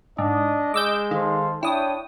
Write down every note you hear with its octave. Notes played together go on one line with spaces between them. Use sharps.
G#2 D4 D#5
G#3 D6 E6 G6
D#3 A4 C5 F5
D4 E4 C#5 G5 D#6